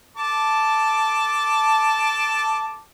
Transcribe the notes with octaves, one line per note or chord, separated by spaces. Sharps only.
A4 A5 D6